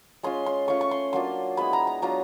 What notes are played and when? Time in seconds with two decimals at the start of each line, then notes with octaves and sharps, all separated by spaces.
0.23 G#3 C#4 F4 C6
0.46 C6
0.68 A3 C#4 F4 C#6
0.81 C#6
0.91 C6
1.13 F#3 A#3 D4 F4 C6
1.57 G#3 B3 E4 B5
1.73 A#5
1.87 A#5
2.02 F#3 B3 D4 F4 A#5